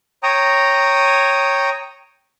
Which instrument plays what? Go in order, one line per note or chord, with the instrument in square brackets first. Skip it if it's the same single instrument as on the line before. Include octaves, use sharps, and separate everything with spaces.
[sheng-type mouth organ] C#5 G5 A#5 D#6